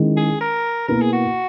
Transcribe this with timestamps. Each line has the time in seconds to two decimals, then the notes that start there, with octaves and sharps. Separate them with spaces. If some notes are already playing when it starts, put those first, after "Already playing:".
Already playing: D#3 G#3 C#4 E4
0.17 G#4
0.41 A#4
0.88 B2 A#3 E4 A#4 B4
1.02 G#4
1.13 F#4